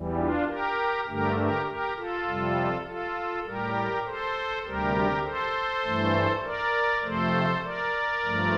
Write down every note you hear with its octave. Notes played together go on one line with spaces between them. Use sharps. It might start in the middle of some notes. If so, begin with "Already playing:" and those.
Already playing: E2 E3 G3
D4 F4
G4 A#4
G2 D3 A3 G4 A#4
G4 A#4
G4 A#4
F4 A4
F2 C3 G3
F4 A4
A2 G3 G4 A#4
A4 C5
D2 C3 G3 G4 A#4
A4 C5
G2 E3 A3
A#4 D5
F2 C3 F3 A3 A4 C5
A#4 D5
G2 F3 A3